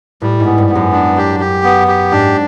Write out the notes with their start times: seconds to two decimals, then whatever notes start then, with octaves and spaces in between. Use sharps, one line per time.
0.22 A2 G3
0.40 G#2
0.45 B3
0.58 G2
0.69 B3
0.75 F#2
0.93 D4
1.17 G4
1.40 G4
1.64 B3
1.88 G4
2.11 G#2 D4